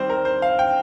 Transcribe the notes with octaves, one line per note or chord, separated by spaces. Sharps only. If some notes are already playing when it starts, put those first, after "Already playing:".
Already playing: D#3 G3 C4 C5
A#4
C5
F5
G5